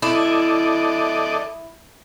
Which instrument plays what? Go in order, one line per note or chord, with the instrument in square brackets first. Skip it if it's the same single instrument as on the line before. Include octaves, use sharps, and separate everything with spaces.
[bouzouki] E4 [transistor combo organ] A4 D5 D#5